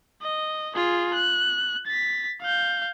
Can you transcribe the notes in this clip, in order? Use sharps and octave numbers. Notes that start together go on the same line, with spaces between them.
D#5
F4 G#4
F#6
A6 B6
F5 G6